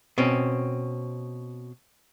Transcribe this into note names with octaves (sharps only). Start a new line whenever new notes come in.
B2 C4 C#4